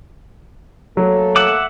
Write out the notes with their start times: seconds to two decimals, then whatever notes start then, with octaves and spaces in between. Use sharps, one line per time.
0.97 F#3 A3 A#3 A4
1.36 E5 F#5 D6